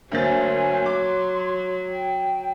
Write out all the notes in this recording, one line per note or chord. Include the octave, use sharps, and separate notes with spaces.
D2 F#3 A#3 C5 G#5 A6
C6 D6
G5